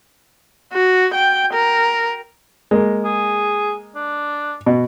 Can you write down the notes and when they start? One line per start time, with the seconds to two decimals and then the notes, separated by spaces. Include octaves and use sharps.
0.73 F#4
1.14 G5
1.53 A#4
2.71 G#3 A#3
3.05 G#4
3.96 D4
4.66 B2